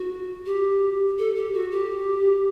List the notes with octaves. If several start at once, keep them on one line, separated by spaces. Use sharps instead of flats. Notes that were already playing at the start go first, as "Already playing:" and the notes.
Already playing: F#4
G4
A4
G4
F#4
G4